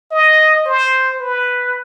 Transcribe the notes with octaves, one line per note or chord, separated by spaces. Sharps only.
D#5
C5
B4